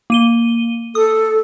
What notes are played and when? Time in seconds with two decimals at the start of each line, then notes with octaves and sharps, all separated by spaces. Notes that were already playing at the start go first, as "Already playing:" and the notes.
0.10 A#3 D#7 G7
0.95 A4 D#6